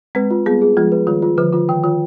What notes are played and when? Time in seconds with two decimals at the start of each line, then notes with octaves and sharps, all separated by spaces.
0.15 G#3 C4 B4
0.31 F4
0.46 G3 B3 G#4
0.62 G#4
0.77 F3 G#3 F4
0.92 B4
1.07 D#3 G3 F4
1.22 F4
1.38 D3 F3 B4
1.53 D3 F4
1.69 D#3 G5
1.84 D#3 F4